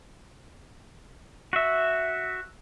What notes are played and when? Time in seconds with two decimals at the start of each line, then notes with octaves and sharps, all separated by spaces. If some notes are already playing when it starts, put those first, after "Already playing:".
1.53 F#4 E5